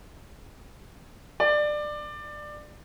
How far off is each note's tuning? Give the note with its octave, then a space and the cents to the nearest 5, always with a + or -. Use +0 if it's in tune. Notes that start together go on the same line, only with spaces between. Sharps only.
D5 +20